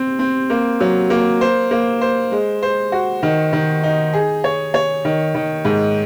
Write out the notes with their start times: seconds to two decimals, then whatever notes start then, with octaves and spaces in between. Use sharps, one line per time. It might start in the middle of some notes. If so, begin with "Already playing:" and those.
Already playing: C4
0.19 C4
0.50 A#3
0.80 F#3
1.10 A#3
1.41 C5
1.71 A#3
2.01 C5
2.32 G#3
2.63 C5
2.92 F#4
3.23 D#3
3.53 D#3
3.83 D#4
4.14 G#4
4.44 C#5
4.74 C#5
5.05 D#3
5.35 D#3
5.65 G#2